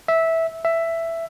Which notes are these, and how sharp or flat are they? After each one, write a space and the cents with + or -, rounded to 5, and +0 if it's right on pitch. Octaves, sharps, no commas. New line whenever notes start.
E5 -10
E5 +10